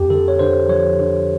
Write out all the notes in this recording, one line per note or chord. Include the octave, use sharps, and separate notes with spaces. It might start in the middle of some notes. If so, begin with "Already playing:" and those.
Already playing: F2 G4
D3 A4
C#5
D3 C5
F3 C#5
D3